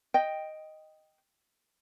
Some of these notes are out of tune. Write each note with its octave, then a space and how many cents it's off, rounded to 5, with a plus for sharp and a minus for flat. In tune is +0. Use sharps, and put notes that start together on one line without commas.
D#5 +0 G5 +0